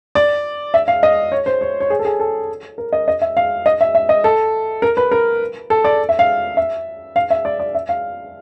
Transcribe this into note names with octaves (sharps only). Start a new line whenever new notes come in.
D5
E5
F5
D#5
C#5
C5
C#5
C#5
G#4
A4
G#4
A4
A#4
D#5
D#5
E5
F5
D#5
E5
E5
D#5
A4
A#4
B4
A#4
A4
D5
E5
F5
E5
F5
E5
D5
D5
E5
F5